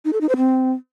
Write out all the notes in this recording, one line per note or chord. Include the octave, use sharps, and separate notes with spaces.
D#4
A4
D#4
C5
C4